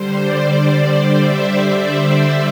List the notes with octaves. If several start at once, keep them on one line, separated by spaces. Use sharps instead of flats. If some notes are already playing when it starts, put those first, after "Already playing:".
Already playing: D3 G3 C5
D5
C5
D5
E5
C5
D5